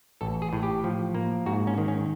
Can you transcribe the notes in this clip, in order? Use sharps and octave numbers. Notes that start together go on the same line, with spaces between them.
A1 A4
G#4
A2
G4
F3
A#3
G#2 F#4
C#4
D#3
C#4